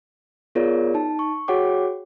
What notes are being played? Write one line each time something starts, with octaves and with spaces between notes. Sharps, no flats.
B3 F4 G#4 A#4 C#5 D5
D#4 A5
C#6
F#4 G#4 C#5 F#5 G5 D6